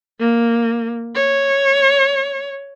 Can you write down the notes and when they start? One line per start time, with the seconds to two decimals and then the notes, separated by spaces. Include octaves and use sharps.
0.20 A#3
1.15 C#5